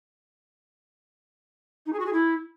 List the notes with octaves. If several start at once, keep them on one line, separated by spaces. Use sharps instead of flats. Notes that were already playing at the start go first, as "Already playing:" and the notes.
D#4
G#4
F#4
G#4
E4